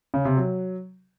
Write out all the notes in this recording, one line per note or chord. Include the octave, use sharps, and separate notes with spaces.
C#3
C3
F#3